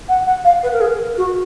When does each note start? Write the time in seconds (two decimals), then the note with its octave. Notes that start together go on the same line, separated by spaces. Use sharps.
0.09 F#5
0.27 F#5
0.44 F5
0.63 B4
0.73 A#4
0.81 G#4
0.90 A#4
1.17 F#4